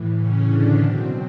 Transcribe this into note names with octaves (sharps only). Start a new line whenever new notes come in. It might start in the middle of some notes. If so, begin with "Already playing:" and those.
Already playing: A2 E3
C#3 C#4
D3 D4
B2 F#3 C4